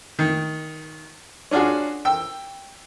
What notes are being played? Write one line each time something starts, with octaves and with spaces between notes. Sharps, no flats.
D#3
C#4 D4 F4 F#4 G#4
G5 E6